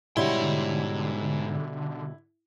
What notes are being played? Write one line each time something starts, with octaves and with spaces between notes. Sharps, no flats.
G#2 B2 D3 G3 E4 C#5 C6